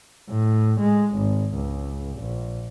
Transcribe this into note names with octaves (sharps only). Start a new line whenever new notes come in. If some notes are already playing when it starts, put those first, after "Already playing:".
A2
G#3
G#1
C#2
A#1